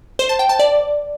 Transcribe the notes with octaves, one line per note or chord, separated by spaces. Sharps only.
C5
A5
G5
A5
D5